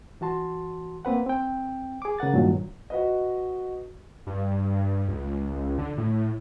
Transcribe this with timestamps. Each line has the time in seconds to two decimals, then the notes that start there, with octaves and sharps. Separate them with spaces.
0.21 E3 F#4 A5 C6
1.05 A#3 C4 B4 F#5
1.26 C4 G5
2.02 G#4 D6
2.19 C#3 A#4 F#5 A6
2.34 G2 A#2 D#3 F#3
2.90 F#4 B4 D#5
4.27 G2
5.08 C#2
5.78 D3
5.98 A2